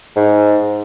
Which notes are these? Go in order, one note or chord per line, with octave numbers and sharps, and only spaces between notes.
G#2